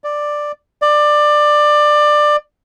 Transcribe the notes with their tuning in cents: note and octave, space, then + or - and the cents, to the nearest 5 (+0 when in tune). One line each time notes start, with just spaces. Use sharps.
D5 +5
D5 +20